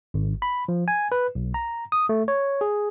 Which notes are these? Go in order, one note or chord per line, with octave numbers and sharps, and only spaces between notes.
G#1
B5
F3
G#5
B4
B1
A#5
D#6
A3
C#5
G#4